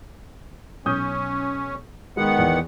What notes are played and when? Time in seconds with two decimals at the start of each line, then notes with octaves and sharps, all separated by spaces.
0.86 B1 C#4 D#6 G6
2.17 D#3 G#3 B3 F#5
2.38 E2